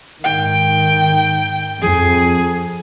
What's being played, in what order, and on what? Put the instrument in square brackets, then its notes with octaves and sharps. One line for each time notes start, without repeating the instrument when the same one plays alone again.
[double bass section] G#2 D#3 [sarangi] G5
[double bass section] F2 [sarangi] G#4